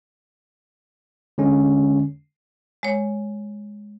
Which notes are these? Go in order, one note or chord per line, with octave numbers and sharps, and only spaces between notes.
D3 G#3 C#4
G#3 C#5